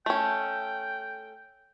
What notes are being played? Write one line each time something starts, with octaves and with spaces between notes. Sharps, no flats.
A3 C#4 G5